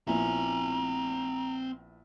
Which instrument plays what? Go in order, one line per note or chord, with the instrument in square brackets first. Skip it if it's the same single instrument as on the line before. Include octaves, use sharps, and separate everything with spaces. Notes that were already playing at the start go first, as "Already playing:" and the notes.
[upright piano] A#1 B3 E4 [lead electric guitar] C4 G#5 [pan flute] A#5